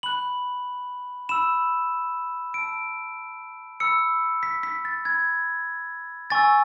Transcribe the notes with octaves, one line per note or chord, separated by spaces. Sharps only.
B5 F#6 F#7
B5 E6 E7
A5 E6 D7
B5 E6 C#7
B6
B6
A6
B5 F#6 G#6
G#5 C#6 E6 A6